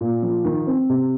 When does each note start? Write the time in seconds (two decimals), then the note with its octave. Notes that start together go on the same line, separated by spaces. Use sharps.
0.01 A#2
0.22 F3
0.45 D#3
0.67 C4
0.89 C3